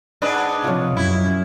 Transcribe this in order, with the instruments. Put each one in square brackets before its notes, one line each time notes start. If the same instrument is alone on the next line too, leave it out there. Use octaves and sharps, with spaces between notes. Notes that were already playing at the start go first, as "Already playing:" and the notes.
[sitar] G#2 D4 B4 [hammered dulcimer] D#5
[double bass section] C3 F3 [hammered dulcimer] F4 C#5
[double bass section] F#2 [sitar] E4